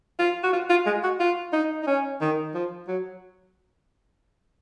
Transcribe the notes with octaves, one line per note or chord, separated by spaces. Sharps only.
F4
F#4
F4
F4
G#3
F#4
F4
D#4
D#4
C#4
D#3
F3
F#3